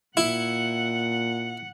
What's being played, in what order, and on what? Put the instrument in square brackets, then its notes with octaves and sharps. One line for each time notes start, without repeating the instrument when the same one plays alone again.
[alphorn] A#2 [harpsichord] E4 [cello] F#5